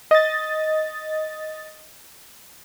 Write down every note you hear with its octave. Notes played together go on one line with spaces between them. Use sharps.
D#5 A6